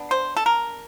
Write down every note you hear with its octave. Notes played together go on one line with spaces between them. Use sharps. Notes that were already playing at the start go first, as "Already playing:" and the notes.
Already playing: B3 D4
C5
A4
A#4